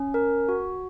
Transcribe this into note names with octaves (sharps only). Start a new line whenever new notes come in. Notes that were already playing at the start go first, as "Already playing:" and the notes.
Already playing: C#4
A#4
F#4